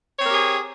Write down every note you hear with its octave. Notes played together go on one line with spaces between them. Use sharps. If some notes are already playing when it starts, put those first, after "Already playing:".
C4 G4 G#4 A#4 C#5